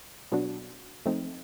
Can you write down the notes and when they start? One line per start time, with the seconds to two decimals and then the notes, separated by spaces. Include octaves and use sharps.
0.32 B2 F#3 B3 D4 F#4
1.06 F3 A3 C4 D#4